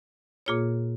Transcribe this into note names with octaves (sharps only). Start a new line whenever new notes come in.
A#2 A#3 F4 G#4 C#5